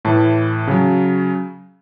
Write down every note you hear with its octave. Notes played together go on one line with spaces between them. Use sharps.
A2 E3 A5
C#3 F#3